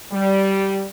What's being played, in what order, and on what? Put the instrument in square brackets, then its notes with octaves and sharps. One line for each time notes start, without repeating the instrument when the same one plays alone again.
[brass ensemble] G3